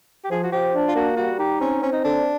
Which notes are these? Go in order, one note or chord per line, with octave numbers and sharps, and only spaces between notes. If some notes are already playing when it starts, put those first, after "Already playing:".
G4
F3 G#4
F#4
F3 G4
D4
F4
A#3 F#4
G3 F#4
D#4 G4
C4 C#4
C4 C#4
D#4
D3 D4